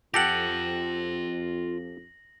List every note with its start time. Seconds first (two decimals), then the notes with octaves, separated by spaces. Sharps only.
0.14 F2 F4 G4 A4 F#5 G5 A#6 F#7